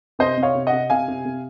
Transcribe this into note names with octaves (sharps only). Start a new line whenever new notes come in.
C3 C5 D#5
C3
C#5 F5
C3
D#5 F#5
C3
C3 F5 G#5
C3
C3